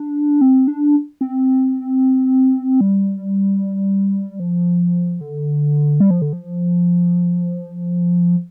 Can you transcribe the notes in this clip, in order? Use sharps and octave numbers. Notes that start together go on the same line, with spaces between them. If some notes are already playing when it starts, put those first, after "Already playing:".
Already playing: D4
C4
D4
C4
G3
F3
D3
G3
F3
D3
F3